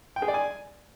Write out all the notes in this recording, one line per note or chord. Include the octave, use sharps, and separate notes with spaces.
G5
G#4
D5
G#5